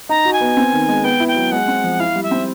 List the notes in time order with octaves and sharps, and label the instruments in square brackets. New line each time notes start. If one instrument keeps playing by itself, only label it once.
[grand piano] D#4 [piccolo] A#5
[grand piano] F#4
[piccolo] G#5
[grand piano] B3
C4
D#3
G#3
[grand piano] B3 [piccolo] G5
[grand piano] E4
[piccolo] G5
[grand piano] F#3
[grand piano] G#3 [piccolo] F#5
[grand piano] C4
F3
[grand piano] E4 [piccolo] F5
[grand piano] G3
[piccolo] E5
[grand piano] C4